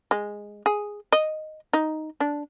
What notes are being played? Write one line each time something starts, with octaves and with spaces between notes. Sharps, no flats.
G#3
G#4
D#5
D#4
D4